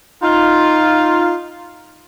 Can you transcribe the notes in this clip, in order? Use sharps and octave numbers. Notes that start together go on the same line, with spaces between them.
D#4 F4